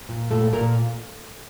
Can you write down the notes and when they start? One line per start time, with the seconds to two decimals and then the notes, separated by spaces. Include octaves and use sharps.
0.09 A#2
0.31 A#2 A3 A4
0.53 A#2 A#3 A#4